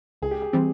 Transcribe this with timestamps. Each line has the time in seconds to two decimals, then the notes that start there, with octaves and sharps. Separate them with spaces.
0.22 C#2 G#4
0.31 G4
0.42 G#4
0.53 C3 E3 G3 C4